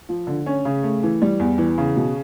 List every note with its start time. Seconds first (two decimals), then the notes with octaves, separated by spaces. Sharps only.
0.09 F3
0.27 D3
0.46 C#4
0.65 C#3
0.83 A3
1.03 E3
1.22 G3
1.39 E2
1.58 E3
1.78 C#3
1.96 B2